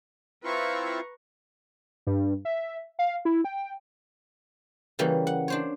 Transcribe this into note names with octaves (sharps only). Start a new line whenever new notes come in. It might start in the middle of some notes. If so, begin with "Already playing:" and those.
C4 E4 F4 B4 A#5 C#6
G2
E5
F5
E4
G5
C#3 E3 G3 A#3
F#5
D4 C5 C#5